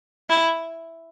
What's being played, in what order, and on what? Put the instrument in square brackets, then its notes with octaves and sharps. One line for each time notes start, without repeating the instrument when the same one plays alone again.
[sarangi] E4